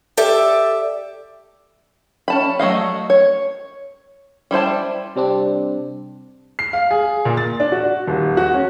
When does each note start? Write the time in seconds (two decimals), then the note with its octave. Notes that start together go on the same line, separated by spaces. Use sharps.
0.17 G4 A4 D5 E5
2.28 C#4 A5 B5
2.59 F#3 A3 D#5 F5
3.10 C#5
4.51 G3 E4 C5 A5
5.16 C3 G3 C4 D4
6.59 C7
6.73 F5
6.91 G#4
7.25 A#2
7.37 A6
7.60 D4
7.72 F#4
8.07 D#1
8.37 F#4
8.54 C#4